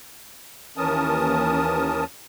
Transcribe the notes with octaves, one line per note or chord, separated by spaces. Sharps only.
D#2 E3 C#4 A#4 A5 D#6